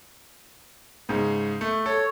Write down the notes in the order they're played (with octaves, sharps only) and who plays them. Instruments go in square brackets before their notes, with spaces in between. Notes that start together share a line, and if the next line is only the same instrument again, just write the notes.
[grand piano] G#2 C#3
A3
[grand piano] A4 [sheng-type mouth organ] C#5